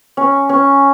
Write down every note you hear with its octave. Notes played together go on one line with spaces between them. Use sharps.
C#4
C#4